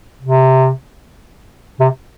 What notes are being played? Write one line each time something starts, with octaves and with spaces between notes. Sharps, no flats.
C3
C3